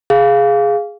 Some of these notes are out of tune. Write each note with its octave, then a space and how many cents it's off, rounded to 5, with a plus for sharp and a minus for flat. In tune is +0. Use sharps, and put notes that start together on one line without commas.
G#4 +0 F5 +0